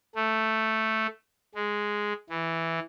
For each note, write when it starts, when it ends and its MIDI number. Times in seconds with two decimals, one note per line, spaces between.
0.15 1.07 57
1.55 2.13 56
2.30 2.79 52